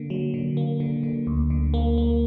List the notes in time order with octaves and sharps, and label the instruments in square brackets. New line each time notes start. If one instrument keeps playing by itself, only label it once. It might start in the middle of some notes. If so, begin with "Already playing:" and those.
Already playing: [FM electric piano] D3 A#3
F#3
D3
A#3
D3
D3
D2
D3
A#3
A#3